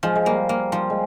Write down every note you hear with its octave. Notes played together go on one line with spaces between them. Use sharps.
F3 G#3
G#3
G3 A#3
A#3
F3 G3
G#3